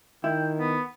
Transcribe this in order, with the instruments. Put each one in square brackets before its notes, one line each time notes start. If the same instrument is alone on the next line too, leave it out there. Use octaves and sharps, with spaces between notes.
[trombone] D#3 [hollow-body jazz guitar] E4 [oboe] G5
[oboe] B3